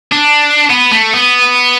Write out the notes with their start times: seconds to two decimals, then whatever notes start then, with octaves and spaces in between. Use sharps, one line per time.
0.12 D4
0.70 B3
0.92 A3
1.14 B3